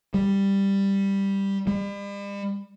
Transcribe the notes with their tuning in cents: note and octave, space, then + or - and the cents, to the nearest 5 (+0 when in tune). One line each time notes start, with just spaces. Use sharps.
G3 +5
G3 +40